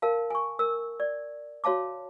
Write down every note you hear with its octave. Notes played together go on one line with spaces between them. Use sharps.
A#4 F5 A5
G#5 C#6
A#4 E6
D5
F#4 C#5 F5 A5 D6